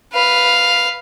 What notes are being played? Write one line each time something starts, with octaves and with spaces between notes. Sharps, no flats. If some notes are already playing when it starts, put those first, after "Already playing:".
B4 F5